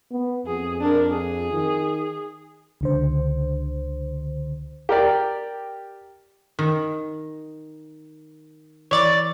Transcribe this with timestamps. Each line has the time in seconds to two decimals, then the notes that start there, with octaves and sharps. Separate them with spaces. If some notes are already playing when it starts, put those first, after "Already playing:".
0.11 B3
0.46 F2 G#4
0.81 D4 A#4
1.11 G#4
1.53 D#3
2.81 C#2 D3 C5
4.89 G4 A#4 D5
6.59 D#3
8.91 E3 C#5 D5 A6